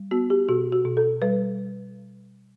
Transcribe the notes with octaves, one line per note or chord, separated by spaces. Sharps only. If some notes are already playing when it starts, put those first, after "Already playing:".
Already playing: G3
B3 F#4
G4
B2 F#4
F#4
B2
A4
G3 B4